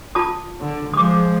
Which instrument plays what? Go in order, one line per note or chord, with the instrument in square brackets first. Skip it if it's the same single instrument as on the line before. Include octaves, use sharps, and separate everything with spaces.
[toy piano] F4 A5 D#6
[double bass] D3
[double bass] F3 G#3 [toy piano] D6 D#6